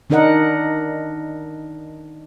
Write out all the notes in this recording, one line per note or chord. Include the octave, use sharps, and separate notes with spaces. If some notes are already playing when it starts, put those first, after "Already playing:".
D#3 D4 D#4 A#4 D#5 F#5